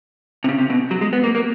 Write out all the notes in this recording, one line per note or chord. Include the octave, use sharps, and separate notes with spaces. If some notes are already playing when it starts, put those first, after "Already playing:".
C3
C#3
C3
B2
F#3
G#3
B3
A#3
A#3